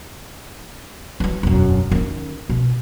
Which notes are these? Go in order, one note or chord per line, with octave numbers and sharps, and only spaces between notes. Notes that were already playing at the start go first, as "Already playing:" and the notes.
E3 F#3
E1 F#2
D#3 C#4
B2